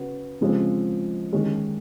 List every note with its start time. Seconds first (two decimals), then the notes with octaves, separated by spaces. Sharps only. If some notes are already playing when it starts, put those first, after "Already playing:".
Already playing: C#3 F#3 B3
0.41 C#3 F3 G#3 C4
1.33 D#3 G#3 C#4